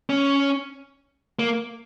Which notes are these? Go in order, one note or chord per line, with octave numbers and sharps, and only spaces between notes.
C#4
A#3